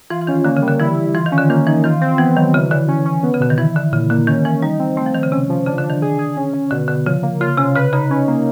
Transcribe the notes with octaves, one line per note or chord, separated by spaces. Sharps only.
E3 F4
E3
D#3 C#4
D3 A#3
C#3
G3
D3
E3 E4
E4
E3 F4
D#3
C#4
D3
D#3 A#3
E3 D#4
D#3 F4
C4
E3 B3
D#3 F#3
C#3 E3
D3 E3
C#4
C#4
B3
C#3
B2 D3
D#3
E3 E4
D3 E4
A#2 C#3
D3 A#3
D#3 C#4
E3 C#4
G3 D#4
C4
A3 C4
F3
D#3 C4
C#3
C3 C#4
F3
C#3 D4
D3
D4
D#3
G#4
G#4
C#4
C#4
B2 D3
B2 D3
C#3 F3
A#3
C#3 F4
C3 C#4
C#3 B4
C#3 D#4
C#4
A#3